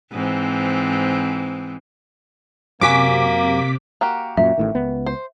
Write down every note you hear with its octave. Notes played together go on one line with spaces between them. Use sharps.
G#2 E3 C4
F#2 C3 A#3 F#4 G#5 D6 B6
A#3 F#4 G4
F#2 A#2 F#3 E5
A1 A2 D#3
C#2 B3
C5